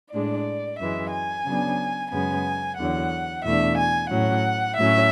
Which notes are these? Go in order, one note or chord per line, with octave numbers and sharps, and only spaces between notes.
A2 G#3 D4 D5
F#2 E3 G#3 E5
G#5
C#3 F#3 B3 D4
F#2 C#3 G#3 B3 G#5
E2 D3 F#3 F#5
E2 B2 A3 D4 E5
G#5
A2 F#3 C#4 F#5
A2 F#3 C#4 E5